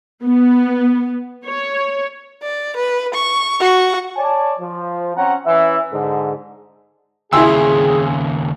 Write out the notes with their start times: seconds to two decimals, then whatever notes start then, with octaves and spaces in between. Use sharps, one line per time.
0.25 B3
1.46 C#5
2.43 D5
2.76 B4
3.14 C#6
3.60 F#4 C#6
4.16 C#5 D5 G#5 A5
4.59 F3
5.16 C4 C#4 C#5 F#5 A#5
5.46 E3 C#4 E5
5.92 G#2 D3
7.33 D#2 C#3 E4 G#4 G5 G#5 C6 E6